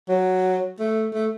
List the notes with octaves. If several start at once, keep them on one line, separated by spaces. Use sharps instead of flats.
F#3
A3
A3